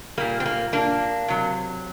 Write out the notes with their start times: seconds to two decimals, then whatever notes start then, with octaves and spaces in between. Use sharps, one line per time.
0.18 A#2 G3 A#3
0.40 C4
0.46 A#3
0.73 A#3 D4
1.28 C3 F#3